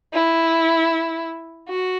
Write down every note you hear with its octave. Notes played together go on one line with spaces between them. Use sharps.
E4
F#4